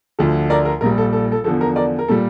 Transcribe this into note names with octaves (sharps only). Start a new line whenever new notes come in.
D2 D3 F3
A#4 D5
A#4
A#1 A#2 G3 A#4
A4
A4
A4
E2 D3 F3 A4
A#4
A#4 D5
A#4
A#2 G3 A4